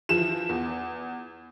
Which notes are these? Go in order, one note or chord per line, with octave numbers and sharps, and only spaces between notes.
E3 F3 E7
E2